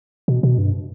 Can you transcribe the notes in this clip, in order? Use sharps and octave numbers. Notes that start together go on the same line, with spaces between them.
B2
B2
G2